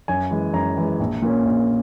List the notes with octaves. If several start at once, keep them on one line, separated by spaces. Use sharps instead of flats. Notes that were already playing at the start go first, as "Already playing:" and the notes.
F#2 G#5
E3 G#3
F#2 A#5
E3 G#3
A#1
A#2 A#3 C#4
A#1